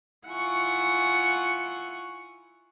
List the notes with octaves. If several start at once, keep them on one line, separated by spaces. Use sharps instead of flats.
E4 F4 F#5 G#5 C#6